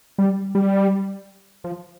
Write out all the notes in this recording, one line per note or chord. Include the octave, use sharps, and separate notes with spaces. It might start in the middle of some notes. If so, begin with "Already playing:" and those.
G3
G3
F3